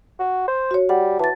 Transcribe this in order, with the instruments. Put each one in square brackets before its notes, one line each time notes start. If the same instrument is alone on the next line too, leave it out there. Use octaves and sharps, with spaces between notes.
[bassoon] F#4
C5
[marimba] F#4 C#5
[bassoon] G3 [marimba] F#5
[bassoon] E3 [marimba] A5 A6